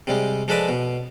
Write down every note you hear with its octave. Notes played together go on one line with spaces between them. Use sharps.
C3 G3 G#3
F3 G#3 A4 B4 D5 D#5
B2